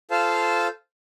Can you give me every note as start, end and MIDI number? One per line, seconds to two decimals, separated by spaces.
0.11 0.68 65
0.11 0.68 69
0.11 0.68 72
0.11 0.68 77
0.11 0.68 81